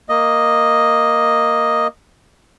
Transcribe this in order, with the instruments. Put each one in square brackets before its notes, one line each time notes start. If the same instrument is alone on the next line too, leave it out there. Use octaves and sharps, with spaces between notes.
[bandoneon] A#3 D#5